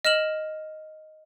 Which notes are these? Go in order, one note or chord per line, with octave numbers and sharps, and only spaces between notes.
D#5 F6 E7 F#7